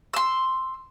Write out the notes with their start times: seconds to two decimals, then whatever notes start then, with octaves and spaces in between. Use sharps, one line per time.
0.13 C6 E6